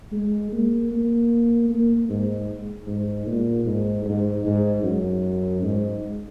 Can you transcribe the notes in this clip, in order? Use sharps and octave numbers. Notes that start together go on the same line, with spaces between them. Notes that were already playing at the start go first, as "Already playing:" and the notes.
G#3
A#3
A#3
A#3
G#2
G#2
A#2
G#2
G#2
G#2
F#2
G#2